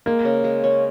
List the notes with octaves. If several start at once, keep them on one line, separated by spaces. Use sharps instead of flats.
G#3 A#3
C#3
G#3
C#4